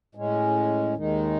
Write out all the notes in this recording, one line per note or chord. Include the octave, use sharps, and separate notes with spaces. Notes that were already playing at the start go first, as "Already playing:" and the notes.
A2 G#3 C#4
D#2 D#3 G#3 D#4